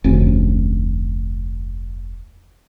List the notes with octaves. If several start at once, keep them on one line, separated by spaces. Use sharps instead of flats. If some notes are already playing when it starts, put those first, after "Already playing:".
F1 D2 C#4